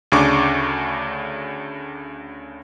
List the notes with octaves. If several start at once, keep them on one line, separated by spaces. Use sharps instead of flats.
D2 C#3 D4 C#6 D6